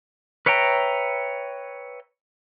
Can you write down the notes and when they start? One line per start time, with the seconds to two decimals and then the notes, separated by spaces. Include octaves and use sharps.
0.46 B4 C#5 E5 G5 A#5